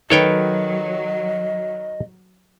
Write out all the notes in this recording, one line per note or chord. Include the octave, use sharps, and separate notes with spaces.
D#3 F#3 A4 B4 C#5 D#5 G5